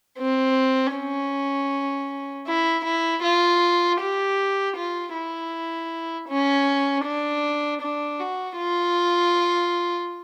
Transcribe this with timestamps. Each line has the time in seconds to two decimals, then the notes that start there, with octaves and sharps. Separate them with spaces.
0.19 C4
0.95 C#4
2.48 E4
2.85 E4
3.24 F4
4.01 G4
4.77 F4
5.15 E4
6.29 C#4
7.05 D4
7.82 D4
8.19 F#4
8.58 F4